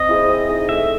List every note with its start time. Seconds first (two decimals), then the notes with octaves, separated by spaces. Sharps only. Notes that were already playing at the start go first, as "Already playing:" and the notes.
Already playing: C4 D#5
0.09 E4 G#4 C5
0.29 C4
0.49 D#4 G#4
0.69 A3 E5